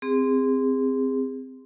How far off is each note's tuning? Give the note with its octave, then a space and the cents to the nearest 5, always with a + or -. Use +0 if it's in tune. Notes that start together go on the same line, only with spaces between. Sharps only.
C4 -10 G#4 -30